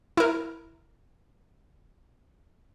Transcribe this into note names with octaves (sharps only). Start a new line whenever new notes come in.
E4 A#4